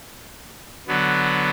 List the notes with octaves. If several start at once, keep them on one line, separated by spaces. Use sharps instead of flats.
D3 F#3 B3